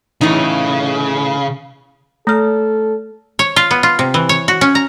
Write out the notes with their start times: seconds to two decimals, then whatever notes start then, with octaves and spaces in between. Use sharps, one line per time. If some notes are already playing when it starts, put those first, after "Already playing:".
0.21 A2 C#3 E3 D#4
2.27 A3 A4 F6
3.39 C#5
3.56 F4
3.71 B3
3.83 F4
3.99 C3
4.14 E3
4.29 C#5
4.48 F#4
4.61 C#4
4.75 A#5